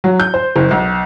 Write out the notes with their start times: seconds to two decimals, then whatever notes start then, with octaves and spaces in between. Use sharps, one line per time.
0.04 F#3
0.20 G6
0.34 C5
0.56 F#1
0.71 B1